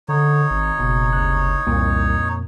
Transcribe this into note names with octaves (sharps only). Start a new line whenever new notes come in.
D3 D#4 C#5
G#1
F#1 B2
D2 C3 F#6
C2 F2 A#2 A#3